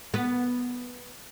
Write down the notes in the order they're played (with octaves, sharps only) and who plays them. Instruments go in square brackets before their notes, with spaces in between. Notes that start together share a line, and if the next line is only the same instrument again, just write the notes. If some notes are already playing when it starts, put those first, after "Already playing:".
[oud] B3